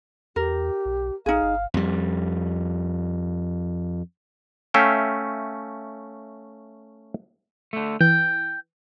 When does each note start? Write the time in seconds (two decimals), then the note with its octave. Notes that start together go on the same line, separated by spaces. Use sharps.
0.36 E2 G4 A#4
0.85 B1
1.26 A#1 D#4 G#4 F5
1.43 G1
1.74 F2 G3
4.74 A3 C#4 E5 F5 G5
7.73 D3 A3
8.01 E3 G5